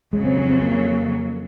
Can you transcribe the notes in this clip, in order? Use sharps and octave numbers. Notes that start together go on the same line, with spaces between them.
F2 C#3 F#3 G#3
C4
C#4
C4
A#3